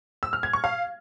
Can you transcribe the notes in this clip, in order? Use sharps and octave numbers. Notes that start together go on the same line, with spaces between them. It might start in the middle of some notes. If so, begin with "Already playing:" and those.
E6
F6
G#6
C#6
F5